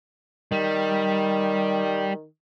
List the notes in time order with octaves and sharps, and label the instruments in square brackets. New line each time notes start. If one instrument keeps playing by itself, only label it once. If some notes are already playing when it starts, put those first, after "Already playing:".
[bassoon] D#3 [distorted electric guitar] G3